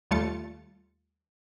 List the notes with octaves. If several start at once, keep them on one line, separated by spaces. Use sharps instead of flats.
D#2 G3 A3 F4 A6 C#7